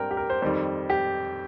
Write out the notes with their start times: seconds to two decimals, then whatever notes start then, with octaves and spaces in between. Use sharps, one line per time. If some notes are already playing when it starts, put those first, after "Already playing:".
Already playing: G2 G3 C4 A#4 G5
0.11 G4
0.17 A#4
0.30 C5
0.42 F2 D#3 G3 C5
0.90 G4